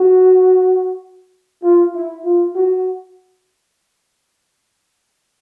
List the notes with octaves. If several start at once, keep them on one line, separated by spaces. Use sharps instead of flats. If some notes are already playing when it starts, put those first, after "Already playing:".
Already playing: F#4
F4
E4
F4
F#4